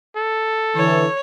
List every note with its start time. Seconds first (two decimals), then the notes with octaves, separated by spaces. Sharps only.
0.16 A4
0.76 D3 E3 C#5